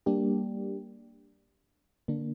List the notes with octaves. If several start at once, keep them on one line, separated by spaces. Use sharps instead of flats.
G3 A#3 D4 G4
D3 A#3 D4